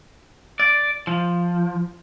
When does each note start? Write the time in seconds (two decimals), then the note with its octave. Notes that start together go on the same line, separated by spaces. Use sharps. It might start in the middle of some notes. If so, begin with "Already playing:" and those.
0.60 D5
1.07 F3